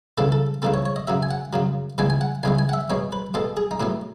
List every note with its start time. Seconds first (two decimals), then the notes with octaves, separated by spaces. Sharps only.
0.18 C#2 C#3 E3 B3 A4
0.32 A4
0.62 C#2 C#3 E3 B3 A4
0.74 C#5
0.86 C#5
0.96 D#5
1.07 F#2 C#3 F#3 E5
1.23 G#5
1.31 F#5
1.53 F#2 C#3 F#3
1.98 C#2 C#3 E3 G#3 B3 G#5
2.10 G#5
2.21 F#5
2.43 C#2 C#3 E3 G#3 B3 G#5
2.59 G#5
2.69 F#5
2.73 E5
2.90 B2 G#3 B3 C#5
3.12 B4
3.34 B2 G#3 B3 A4
3.57 G#4
3.71 D#4
3.80 A2 F#3 B3 E4